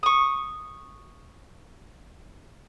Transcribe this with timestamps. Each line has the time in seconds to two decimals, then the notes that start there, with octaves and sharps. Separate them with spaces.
0.03 C#6 D#6